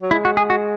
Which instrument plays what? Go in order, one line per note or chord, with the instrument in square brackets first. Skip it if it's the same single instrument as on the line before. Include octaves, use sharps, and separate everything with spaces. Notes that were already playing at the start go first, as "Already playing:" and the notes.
[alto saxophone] F#3
[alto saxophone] G#3 [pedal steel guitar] E4
[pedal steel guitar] F#4
G#4
F#4